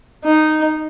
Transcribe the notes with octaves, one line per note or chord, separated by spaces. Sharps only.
D#4